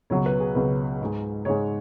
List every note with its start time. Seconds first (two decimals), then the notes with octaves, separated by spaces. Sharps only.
0.10 C#2 B2 F#3 C#5
0.26 B4
0.40 G#4
0.55 C#2 B2 F#3 B4
1.01 G#2 G#3
1.45 G#2 G#3 C#5